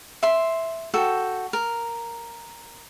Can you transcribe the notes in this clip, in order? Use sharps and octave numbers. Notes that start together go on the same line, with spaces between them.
E5 C6
F#4 A4 G5
A#4